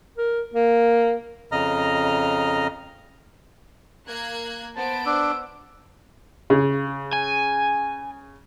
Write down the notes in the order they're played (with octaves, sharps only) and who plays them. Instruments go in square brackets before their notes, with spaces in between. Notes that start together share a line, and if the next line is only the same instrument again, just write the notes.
[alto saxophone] A#4
A#3
[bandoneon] F2 C#3 D#5 A#5 F6
[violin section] A#3 F#6 G#6
[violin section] B3 C5 D7 [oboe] A5
[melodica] D4 [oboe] E6
[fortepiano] C#3
[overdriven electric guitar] G#5